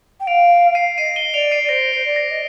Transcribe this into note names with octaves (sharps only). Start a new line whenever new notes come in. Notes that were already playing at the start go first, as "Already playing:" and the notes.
G5
F5 D7 F7
C7 D#7
D#5 C7 D#7
D#7 G7
D5 D7 F7
C7 D#7
D5
C5 A#6 D7
C5 C7
D5
A#6
D#5